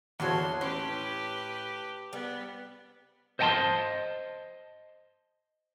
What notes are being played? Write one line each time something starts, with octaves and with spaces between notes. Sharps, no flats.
E2 D4 E4 F#4 A4 C#5 C6
A2 C#4 G4 B4 C6
G3 B3 D5
C5 D#5 F#5 G#5 A5 C6